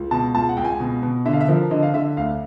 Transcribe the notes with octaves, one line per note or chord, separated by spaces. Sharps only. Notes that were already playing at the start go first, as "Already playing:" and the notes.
Already playing: C#2
B2 A5
C#2 A5
F#5
C#2 G5
G#5
B2
B2
D3 E5
F5
E5
F3 A#4
D3 D#5
F5
D3 E5
D2 F5